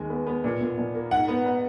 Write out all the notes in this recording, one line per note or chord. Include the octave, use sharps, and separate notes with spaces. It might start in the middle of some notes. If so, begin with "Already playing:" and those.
Already playing: D#2 G#3
B3
B3
A#2
A#2
A#2
A#3
G#2 F#5
B3
B3